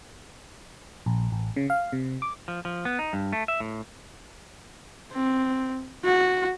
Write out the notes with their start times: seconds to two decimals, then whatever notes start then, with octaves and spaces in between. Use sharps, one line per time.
1.06 A#1
1.32 A1
1.56 C#3
1.70 F5
1.92 C3
2.22 D6
2.48 F3
2.65 F3
2.85 B3
2.99 D#4
3.13 G2
3.33 A3
3.48 E5
3.60 A2
5.12 C4
6.05 F#4